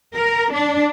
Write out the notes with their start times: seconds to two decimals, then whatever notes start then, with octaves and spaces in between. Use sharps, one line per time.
0.15 A#4
0.53 D4